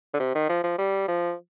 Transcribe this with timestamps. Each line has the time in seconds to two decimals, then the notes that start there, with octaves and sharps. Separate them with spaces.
0.14 D3
0.20 C3
0.35 D#3
0.49 F3
0.64 F3
0.78 G3
1.08 F3